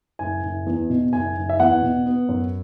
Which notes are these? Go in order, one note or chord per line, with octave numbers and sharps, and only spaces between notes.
F#1 G#5
F#1
E2
B2
F#1 G#5
F#1
E5
E2 F#5
B2
B3
F#2